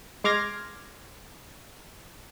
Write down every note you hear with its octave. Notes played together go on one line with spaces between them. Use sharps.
G#3 C6 D6 F6 G#6 A#6